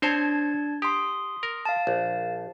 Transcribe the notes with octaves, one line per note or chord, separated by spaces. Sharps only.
C4 D4 C5 C#5 A5 G#6
G4 C6 D#6
A#4
F5 A5
A#1